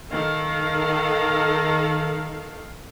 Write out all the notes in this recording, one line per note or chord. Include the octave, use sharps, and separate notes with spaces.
D#3 A4 F5